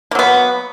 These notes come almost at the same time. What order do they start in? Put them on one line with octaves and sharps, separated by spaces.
A#3 F#3 B3